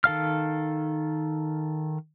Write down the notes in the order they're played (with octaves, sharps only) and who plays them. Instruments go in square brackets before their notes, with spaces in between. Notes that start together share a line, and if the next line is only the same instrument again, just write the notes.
[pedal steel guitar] D#3 A4 F5 F6